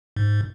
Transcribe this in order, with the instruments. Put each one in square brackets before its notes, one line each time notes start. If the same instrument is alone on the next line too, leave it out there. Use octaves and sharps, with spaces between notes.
[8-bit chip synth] G#2